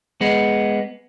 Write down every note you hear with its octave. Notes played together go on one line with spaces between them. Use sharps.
G#3 B3